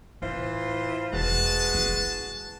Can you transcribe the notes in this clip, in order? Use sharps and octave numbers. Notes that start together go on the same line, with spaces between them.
A2 E3 F4 C5
E1 G#3 D#4 F#4 B4 A5
E4